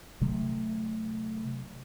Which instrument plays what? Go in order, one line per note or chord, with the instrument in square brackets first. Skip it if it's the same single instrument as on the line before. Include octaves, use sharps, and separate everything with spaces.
[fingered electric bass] C3 F#3 A3